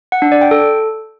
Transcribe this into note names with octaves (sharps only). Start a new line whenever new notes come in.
F#5
D4
D5
G5
A4